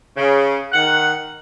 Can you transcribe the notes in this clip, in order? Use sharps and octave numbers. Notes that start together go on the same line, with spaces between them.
C#3
D#3 F#5